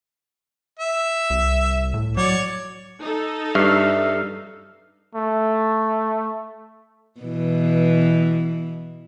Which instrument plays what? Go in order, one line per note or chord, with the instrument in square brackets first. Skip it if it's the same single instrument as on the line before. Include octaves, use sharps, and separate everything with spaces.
[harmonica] E5
[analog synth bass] C2
A2
[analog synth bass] F#3 [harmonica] C#5 D5
[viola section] D#4 A4
[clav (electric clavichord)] G2 [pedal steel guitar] E5 C#6 [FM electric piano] E6 F6 C7
[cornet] A3
[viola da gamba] B2 E3